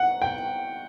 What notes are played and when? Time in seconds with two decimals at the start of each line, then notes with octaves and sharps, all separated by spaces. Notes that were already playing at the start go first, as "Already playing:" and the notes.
Already playing: F#5
0.22 G5